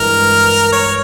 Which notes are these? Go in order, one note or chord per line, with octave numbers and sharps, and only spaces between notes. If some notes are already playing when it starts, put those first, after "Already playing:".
Already playing: G2 E3 G#3 A#4
C#5